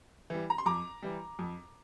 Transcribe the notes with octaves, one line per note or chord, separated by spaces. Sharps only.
E3 G3
A#5
C6
F2 A#5 D6
E3 G3
F2